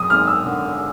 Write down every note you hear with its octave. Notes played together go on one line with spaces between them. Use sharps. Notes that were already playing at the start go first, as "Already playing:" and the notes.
Already playing: F#2 D#6
G#1 F6
E6
D3